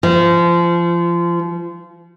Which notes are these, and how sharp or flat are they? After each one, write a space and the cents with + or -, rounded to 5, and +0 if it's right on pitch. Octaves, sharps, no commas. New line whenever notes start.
F3 -25